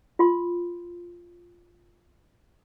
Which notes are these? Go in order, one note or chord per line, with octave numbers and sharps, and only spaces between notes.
F4 C6